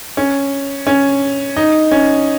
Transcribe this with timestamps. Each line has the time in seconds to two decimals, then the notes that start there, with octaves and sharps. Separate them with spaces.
0.17 C#4
0.87 C#4
1.56 D#4
1.92 C#4